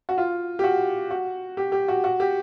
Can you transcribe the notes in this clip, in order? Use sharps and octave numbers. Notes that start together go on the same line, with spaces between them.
F#4
F4
G4
F#4
F#4
G4
G4
F#4
F#4
G4